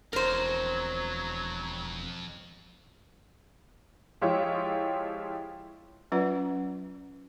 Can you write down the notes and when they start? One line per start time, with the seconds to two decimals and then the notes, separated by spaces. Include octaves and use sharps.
0.13 E1 F2 F#3 A#4 C5
4.22 F3 G#3 E4 F4 G4 C#5
6.12 F#3 C#4 F4 B4 D5 F#5